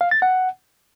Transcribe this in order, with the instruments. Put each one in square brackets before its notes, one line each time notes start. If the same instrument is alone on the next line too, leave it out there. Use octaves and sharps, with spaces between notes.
[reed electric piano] F5
A6
F#5